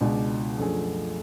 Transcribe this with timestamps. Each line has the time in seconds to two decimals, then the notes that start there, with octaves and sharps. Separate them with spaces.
0.01 C#2 B2 G#3 D4 G#4
0.57 F#2 F3 A3 D4 G#4